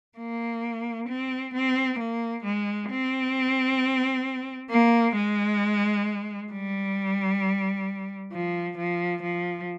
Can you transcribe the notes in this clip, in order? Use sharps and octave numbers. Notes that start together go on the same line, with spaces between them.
A#3
C4
C4
A#3
G#3
C4
A#3
G#3
G3
F3
F3
F3